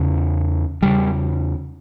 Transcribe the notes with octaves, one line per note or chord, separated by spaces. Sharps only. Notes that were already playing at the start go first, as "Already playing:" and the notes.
Already playing: E2 C#3
E2 C#3 G3